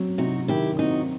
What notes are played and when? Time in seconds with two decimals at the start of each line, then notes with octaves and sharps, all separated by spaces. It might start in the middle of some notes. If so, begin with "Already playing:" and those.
Already playing: F#3 C4
0.18 C3 D#4 F#4
0.48 D#3 E4 G4
0.79 C4 D#4 F#4